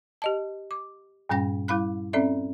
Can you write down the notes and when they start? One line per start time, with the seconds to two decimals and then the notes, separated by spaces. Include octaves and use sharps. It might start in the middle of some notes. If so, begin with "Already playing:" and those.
0.22 G4 D#5 A5
0.71 D6
1.29 G2 A#2 G3 C#4 G5 A#6
1.68 G3 E4 F5 B5 F#6
2.13 C4 C#4 A4 D5 E5